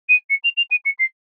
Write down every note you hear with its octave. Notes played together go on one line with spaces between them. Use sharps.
D#7
C#7
F7
F7
D#7
C#7
C7